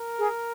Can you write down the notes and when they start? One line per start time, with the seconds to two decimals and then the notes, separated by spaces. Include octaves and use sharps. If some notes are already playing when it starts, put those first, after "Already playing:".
Already playing: A#4
0.19 G#4